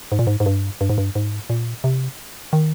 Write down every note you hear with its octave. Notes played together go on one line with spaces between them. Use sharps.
G#2
A#2
G#2
G#2
G2
G2
G#2
G2
G#2
A#2
C3
D#3